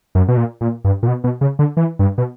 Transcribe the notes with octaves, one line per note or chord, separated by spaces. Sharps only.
F#2
B2
A#2
A#2
G2
A#2
B2
B2
C#3
D3
E3
G2
B2